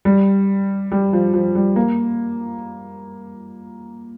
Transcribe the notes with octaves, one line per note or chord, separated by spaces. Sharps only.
G3
G3
F3
F3
G3
A#3